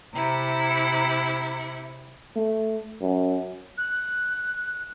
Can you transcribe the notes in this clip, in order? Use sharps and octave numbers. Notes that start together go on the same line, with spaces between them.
C3 E4 A#5
A3
F#2
F#6